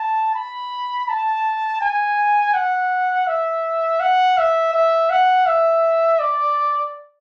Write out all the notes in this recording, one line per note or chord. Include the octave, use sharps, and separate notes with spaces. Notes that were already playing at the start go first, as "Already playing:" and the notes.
Already playing: A5
B5
A5
G#5
F#5
E5
F#5
E5
E5
F#5
E5
D5